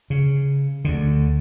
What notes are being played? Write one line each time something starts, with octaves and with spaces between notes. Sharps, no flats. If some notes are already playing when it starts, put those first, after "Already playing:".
C#3
D2 D3